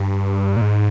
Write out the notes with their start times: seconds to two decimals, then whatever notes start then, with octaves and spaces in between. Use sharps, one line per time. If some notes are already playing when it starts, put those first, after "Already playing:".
Already playing: G2
0.56 A#2
0.61 G#2